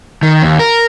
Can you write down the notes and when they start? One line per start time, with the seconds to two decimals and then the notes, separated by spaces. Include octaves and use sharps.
0.23 D#3
0.42 D#2
0.59 A#4